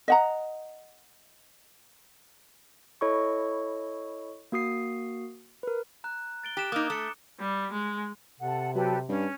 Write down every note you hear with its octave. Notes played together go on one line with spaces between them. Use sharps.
D#5 F#5 A#5
E4 A4 C#5 D#5 B5 C#6
A#3 F#4 D#6 C7
A#4 B4
A#5 F#6
A6 D7 G7
G4 F#6 E7
A#3 D#4 D6 D#6
A3 A#5 C#7
G3
G#3
C3 A4 F#5
F#3 G4 A4 B4
G2 C#4